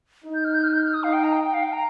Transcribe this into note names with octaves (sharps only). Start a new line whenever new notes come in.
D#4
G6
F6
G6
F6
G6
F6
D#6
D#4 F5
G5
A#5
G5
G5
F5
G5
A#5